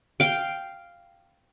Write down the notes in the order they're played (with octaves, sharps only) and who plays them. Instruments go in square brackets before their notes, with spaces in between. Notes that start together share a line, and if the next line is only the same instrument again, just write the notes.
[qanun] F5 G5